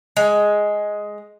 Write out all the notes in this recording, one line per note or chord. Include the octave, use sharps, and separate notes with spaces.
G#3